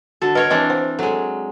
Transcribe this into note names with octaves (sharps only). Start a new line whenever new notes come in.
D3 F#4 A4
A#4 B4 C#5 D#5
E3 C4 D4 D#5
C5
F#3 G#3 A4